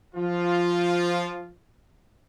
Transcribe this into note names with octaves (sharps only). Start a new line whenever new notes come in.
F3 F4